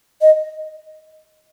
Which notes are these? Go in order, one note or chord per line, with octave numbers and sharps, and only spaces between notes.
D#5